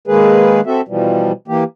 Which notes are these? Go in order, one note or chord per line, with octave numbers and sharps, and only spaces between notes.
D#3 G#3 A#3 G#4 B4
C4 F#4 A4 E5
B2 E3 F3 G3
E3 A#3 G4